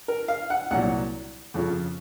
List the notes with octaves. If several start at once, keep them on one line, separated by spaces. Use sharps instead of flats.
A#4
F5
F#5
C2 A#2 F#3 F#5
F2 C#3 F3